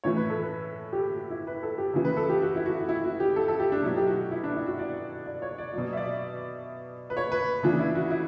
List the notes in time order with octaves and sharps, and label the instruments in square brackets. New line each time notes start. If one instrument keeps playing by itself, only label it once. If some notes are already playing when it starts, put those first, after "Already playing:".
[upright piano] A2 E3 C#5
B4
A4
B4
G4
A4
F#4
E4
B4
A4
G4
C#3 E3
B4
A4
G4
F#4
E4
F#4
E4
F#4
G4
A4
A4
G4
D4
B2 F#3 E4
G4
F#4
E4
D4
E4
F#4
D5
D5
C#5
D5
B2 F#3 D5
E5
D5
B4
C#5
B4
C#3 E3 D4
E4
F#4
E4